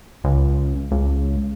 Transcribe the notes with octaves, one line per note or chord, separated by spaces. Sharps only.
C#2
C#2